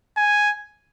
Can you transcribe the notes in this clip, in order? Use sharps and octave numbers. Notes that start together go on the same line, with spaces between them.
G#5